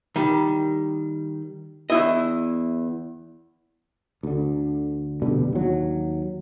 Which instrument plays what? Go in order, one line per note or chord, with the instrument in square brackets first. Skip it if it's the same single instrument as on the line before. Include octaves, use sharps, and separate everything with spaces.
[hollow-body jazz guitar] D#3 G3
E2 E4 D#5
[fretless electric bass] D2 D3
F1 B2 D3 G3
D#2 F#3